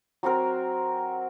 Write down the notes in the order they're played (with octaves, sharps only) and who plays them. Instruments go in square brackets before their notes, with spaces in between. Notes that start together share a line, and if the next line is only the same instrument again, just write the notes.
[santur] F#3 C4 F#4 A#4